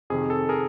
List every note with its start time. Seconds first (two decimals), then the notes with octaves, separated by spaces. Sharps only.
0.10 F2 C3 D#3 G#4
0.30 A4
0.49 G#4 A#4